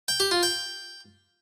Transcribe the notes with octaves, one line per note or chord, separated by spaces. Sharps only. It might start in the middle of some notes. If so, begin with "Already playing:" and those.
G5
G4
F4
G5